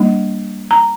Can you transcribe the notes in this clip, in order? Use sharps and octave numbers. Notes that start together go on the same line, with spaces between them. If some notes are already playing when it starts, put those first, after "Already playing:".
Already playing: G3 A#3 D4
A#5